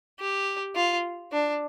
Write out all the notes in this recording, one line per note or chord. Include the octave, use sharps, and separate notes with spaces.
G4
F4
D4